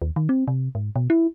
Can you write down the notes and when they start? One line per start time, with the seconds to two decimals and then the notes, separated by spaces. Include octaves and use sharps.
0.02 D#2
0.16 D#3
0.29 C4
0.48 C3
0.75 G#2
0.96 B2
1.10 E4